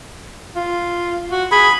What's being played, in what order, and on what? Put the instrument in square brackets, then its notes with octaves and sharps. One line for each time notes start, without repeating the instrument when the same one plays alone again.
[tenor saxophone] F4
F#4
[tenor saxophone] G#4 [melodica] B5